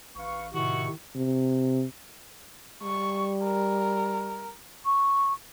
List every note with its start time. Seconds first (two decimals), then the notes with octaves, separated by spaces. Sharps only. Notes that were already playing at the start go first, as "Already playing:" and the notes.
0.16 A1 B4 F5 C#6
0.54 A2 C3 D#3 D#4 E4 F#4 C#6
1.15 C3
2.83 G3 C#6
3.44 A#4
4.85 C#6